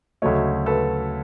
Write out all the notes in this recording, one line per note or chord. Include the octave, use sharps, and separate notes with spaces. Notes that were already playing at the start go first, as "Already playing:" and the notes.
D2 C#3 F#3 A3 C#5 D#5
A4 B4